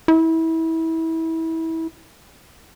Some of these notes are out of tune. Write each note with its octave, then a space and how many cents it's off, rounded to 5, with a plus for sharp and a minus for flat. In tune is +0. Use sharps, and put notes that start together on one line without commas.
E4 -25